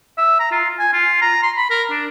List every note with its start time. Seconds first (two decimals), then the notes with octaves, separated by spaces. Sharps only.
0.18 E5
0.40 A#5
0.51 F4
0.79 G#5
0.93 F4
1.22 A#5
1.43 C6
1.57 B5
1.70 A#4
1.90 D4